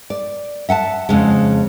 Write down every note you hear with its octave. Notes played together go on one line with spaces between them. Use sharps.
D5
E5 F#5 G#5 A5
F2 C#3 G#3